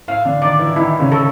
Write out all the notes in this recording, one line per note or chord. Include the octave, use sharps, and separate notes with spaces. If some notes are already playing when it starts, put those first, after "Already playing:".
A2 A3 F5
D3 D4
D#3 D#4 D5
E3 E4
D#3 D#4 E4
C#3 C#4
A4